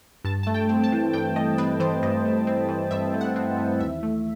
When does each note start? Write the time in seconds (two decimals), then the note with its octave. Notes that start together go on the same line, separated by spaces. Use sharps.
0.24 G2 A5
0.43 A3 A5
0.54 G5
0.69 C4
0.84 A5
0.92 E3
1.13 G2 G5
1.36 A3 D#5
1.58 C4 B4
1.80 E3 C5
2.03 G2 D#5
2.25 A3
2.47 C4
2.69 E3
2.91 G2 E5
3.14 A3
3.21 F#5
3.36 C4
3.59 E3
3.80 D#2 E5
4.03 A3